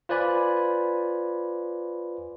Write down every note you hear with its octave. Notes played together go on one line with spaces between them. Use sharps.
F4 B4 C5 D5 G#5 B5